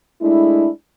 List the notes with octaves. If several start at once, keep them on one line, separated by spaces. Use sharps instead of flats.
G#3 A3 D4 E4